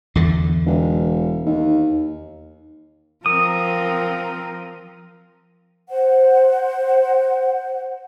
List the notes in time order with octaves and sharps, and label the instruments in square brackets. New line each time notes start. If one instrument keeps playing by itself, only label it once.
[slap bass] E2 D3
[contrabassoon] E1
D#2
[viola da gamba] F3 [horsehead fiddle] C4 A#4 [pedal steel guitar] D#6
[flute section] C5 F#5